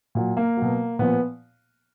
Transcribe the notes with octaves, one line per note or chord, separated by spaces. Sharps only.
A#2 F#3
A#3
B2 F#3
A#2 F3 B3